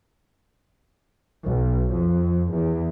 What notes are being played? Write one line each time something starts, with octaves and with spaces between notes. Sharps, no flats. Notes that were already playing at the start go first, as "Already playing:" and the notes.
B1
F2
E2